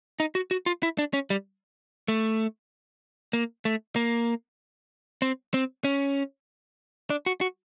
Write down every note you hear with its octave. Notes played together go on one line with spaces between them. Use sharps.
D#4
F#4
F#4
F4
E4
D4
C#4
G3
A3
A#3
A3
A#3
C4
C4
C#4
D4
F#4
F#4